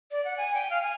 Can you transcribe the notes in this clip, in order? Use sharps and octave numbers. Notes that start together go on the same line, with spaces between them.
D5
F#5
G#5
G5
F5
G#5